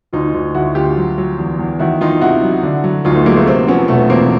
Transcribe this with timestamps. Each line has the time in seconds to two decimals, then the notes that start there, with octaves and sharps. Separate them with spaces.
0.13 D2 D#4 F4
0.34 D2
0.55 D2 E4 F#4
0.75 D2 F4 G4
0.97 F#3
1.18 F#3
1.38 E2
1.59 E2
1.79 D#3 E4 F#4
2.01 D#3 D#4 F4
2.21 C3 E4 F#4
2.43 F#3
2.63 D3
2.84 F#3
3.05 D2 D#4 F4
3.15 A3 B3
3.26 F#3 G#3 A#3
3.36 A3 B3
3.47 C3 A#3 C4
3.67 F3 B3 C#4
3.88 E1 A3 B3
4.10 E2 A#3 C4